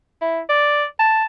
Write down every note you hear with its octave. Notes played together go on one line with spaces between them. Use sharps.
E4
D5
A5